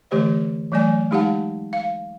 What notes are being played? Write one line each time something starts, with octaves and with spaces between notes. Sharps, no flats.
D3 E3 A3 G4 C5 D#5
E3 F#3 A3 D5 G#5
G#3 D#4 G4 F5 F#5 A5
F5